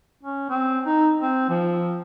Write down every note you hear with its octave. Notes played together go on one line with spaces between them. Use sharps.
C#4
C4
D#4
C4
F3